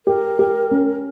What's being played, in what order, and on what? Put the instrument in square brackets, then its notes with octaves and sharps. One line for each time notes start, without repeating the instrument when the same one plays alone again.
[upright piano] G4 [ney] A#4
[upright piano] G4
C#4